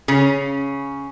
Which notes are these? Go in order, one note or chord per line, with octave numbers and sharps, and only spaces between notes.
C#3 C#4